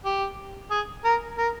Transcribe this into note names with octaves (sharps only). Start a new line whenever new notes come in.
G4
G#4
A#4
A#4